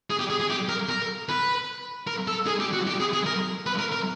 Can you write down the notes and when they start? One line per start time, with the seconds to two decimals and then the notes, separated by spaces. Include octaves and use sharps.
0.10 G#4
0.19 G4
0.30 G#4
0.40 G#4
0.50 G4
0.69 A#4
0.89 A#4
1.29 B4
2.07 A#4
2.28 A4
2.47 G#4
2.60 G4
2.73 F#4
2.87 G4
3.00 G#4
3.13 G#4
3.26 A#4
3.66 B4
3.79 A#4
3.92 A#4